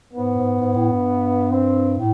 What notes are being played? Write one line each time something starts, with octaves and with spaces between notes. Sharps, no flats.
G#2 B3
G#2
G#2
A2
G2
C4
A2